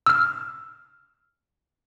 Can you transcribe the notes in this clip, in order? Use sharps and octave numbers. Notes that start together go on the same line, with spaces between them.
E6 F6